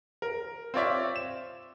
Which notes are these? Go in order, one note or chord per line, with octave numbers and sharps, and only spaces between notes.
A#4
C4 F4 C#5 D5 E5
E7